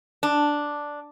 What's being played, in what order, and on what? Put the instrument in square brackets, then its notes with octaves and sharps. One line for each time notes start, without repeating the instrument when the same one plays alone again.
[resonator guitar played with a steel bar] D4